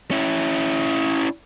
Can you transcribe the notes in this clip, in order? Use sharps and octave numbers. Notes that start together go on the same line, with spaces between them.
C#4 E4